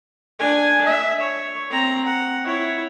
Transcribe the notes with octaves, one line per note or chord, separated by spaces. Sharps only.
D4 G#5
E5
C#5
C4 A#5
F#5
E4 C#5